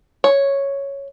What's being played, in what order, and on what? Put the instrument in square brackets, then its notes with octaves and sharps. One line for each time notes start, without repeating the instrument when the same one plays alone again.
[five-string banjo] C#5